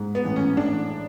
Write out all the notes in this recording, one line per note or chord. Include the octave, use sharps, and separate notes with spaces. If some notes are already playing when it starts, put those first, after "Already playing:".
Already playing: G#2
B3
A1
C#4
A1 D4